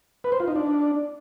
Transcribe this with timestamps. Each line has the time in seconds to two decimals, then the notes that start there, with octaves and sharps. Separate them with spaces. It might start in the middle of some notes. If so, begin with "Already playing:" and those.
0.24 B4
0.32 C5
0.40 F4
0.48 D#4
0.55 D4